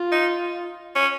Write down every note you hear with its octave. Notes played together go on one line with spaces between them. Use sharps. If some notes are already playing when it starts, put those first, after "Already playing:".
Already playing: F4
D#4
C#4